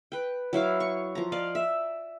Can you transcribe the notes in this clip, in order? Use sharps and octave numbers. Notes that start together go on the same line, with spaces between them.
B4 G5
F#3 E4 F5 D6
C#6
F3 A#5
D5 D#5 F5
E5